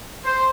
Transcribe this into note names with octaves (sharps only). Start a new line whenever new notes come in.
C5